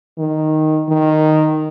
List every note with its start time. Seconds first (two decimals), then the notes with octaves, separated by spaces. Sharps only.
0.19 D#3
0.89 D#3